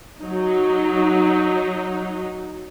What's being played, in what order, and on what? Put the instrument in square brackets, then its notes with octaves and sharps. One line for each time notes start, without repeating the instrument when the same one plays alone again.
[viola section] F#3 D#4